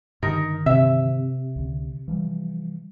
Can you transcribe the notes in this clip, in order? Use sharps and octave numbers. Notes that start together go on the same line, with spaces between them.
G2 D3 D#3 D#4 A#4
C3 E5
C#2 D3
E3 F3 G3